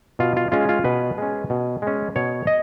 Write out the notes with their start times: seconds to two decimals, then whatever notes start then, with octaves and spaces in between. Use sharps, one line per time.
0.19 B2 F4
0.37 F4
0.52 G#3 C#4 F4
0.69 F4
0.84 B2 B4
1.18 G#3 C#4
1.50 B2
1.82 G#3 C#4
2.16 B2 C#5
2.47 D#5